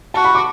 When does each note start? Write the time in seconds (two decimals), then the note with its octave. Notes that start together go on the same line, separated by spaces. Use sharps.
0.14 F#4 A5
0.24 B5
0.35 D6